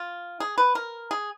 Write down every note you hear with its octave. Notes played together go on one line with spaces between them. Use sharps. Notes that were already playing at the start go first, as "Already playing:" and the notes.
Already playing: F4
G#4
B4
A#4
G#4